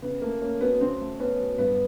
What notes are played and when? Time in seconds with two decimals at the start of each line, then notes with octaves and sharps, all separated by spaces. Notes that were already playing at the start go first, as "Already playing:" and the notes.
0.02 C#3 B3
0.22 A3 A#3
0.42 A#3 C#4
0.61 F#3 B3
0.81 C#3 C4
1.00 A3
1.20 B3 C#4
1.39 F#3
1.58 G2 B3